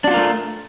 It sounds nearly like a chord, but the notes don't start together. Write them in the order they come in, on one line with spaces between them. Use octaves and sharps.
D4 F#4 F4 A#4 A3